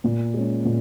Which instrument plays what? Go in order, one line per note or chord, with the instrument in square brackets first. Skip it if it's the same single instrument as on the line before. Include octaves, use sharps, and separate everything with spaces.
[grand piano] A#2
G#3 C#4
A#2